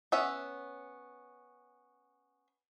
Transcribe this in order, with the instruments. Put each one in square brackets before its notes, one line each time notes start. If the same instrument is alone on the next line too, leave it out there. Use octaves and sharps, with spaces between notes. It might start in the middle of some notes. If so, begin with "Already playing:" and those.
[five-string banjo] B3 C#4 E5